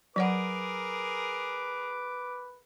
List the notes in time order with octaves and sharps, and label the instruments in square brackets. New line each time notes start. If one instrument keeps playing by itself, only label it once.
[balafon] F#3 C#5 F#5 [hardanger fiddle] G#4 A#4 [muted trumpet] B4 [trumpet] D6